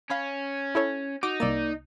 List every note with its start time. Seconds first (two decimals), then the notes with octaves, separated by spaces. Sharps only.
0.10 C#4 F5 B5
0.75 E4 A4 C#5
1.23 D#4 F#4 D6
1.40 C2 A#3 D5 E6 A6